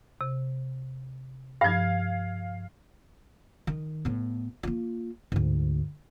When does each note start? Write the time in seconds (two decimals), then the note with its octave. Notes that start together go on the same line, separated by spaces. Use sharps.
0.21 C3
1.61 G2 F3 F5 G#6
3.67 D#3
4.05 A2 B3
4.63 A#3 F4
5.32 D2 G#2